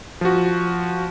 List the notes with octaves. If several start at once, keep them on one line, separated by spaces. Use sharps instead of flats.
F3 F#4